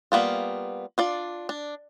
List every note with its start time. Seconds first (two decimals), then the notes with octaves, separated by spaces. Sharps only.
0.12 G3 A#3 B3 F4
0.98 D4 F4 D5
1.49 D4